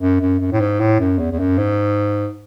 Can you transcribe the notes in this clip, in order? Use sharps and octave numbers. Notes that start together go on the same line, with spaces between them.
F#2
F#2
F#2
A2
G#2
A2
F#2
E2
E2
F#2
G#2